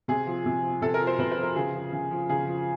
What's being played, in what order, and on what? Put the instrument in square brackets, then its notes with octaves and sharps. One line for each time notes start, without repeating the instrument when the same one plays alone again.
[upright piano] C3 G#4
F3
C3
F3
C3 A4
A#4
F3
C5
C3 B4
B4
F3
A#4
C#3 G#4
F3
C#3
F3
C#3 G#4
F3